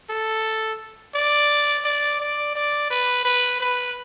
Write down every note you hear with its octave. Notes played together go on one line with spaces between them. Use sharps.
A4
D5
D5
D5
D5
B4
B4
B4